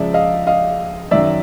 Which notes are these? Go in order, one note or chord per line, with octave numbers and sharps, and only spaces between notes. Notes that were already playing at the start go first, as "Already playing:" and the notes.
Already playing: C#2 C#3 F3 D5 E5
D#5 F5
D#5 F5
F#2 D#3 F#3 D5 E5